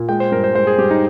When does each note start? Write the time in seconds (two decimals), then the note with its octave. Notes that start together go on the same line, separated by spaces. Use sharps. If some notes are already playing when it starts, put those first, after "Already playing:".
Already playing: A#2
0.09 G#3 G5
0.20 C5
0.32 G2 A#4
0.44 C5
0.55 G#3 C5
0.67 G#4
0.78 G2 G4
0.91 D#4